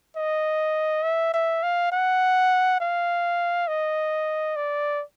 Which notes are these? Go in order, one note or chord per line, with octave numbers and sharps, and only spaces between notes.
D#5
E5
E5
F5
F#5
F5
D#5
D5